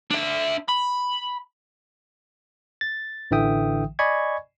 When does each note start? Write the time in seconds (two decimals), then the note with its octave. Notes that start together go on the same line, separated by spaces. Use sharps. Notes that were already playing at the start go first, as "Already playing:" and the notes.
0.11 D4 E5
0.69 B5
2.81 A6
3.31 A1 D3 E3 E5 G5 D#6
3.99 D5 D#5 G#5 B5 C#6 G#6